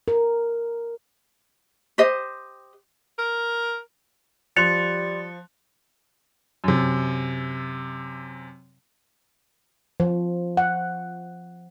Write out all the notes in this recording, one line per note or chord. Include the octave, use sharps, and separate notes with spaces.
A#4
G4 C5 D#5
A#4
F3 G3 C6 F#6 A6 C#7 F7
F#2 C3
F3
F#5